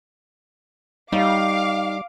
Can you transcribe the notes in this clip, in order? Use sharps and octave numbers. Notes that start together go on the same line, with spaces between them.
G3 D#4 G4 C#5 F5 D6